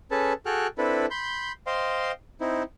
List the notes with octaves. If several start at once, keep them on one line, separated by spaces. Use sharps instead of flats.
C#4 G#4 A4 B4 A5
F#4 G#4 A4 G5 F6 F#6
C4 D4 E4 A4 B4
B5 C6 G6
C5 D#5 F5 G5 C6
C4 D#4 E4